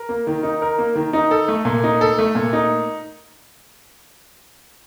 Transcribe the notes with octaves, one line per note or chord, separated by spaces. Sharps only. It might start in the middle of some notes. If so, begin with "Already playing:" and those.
Already playing: A#4
A#3
D#3
D#4
A#4
A#3
D#3
D#4
A4
A3
A#2
D#4
A4
A3
A#2
D#4